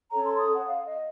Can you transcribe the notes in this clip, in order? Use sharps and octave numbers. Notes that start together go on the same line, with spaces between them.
C#4 A4 C#5 A#5
C6
D#6
F#5
F5
D#5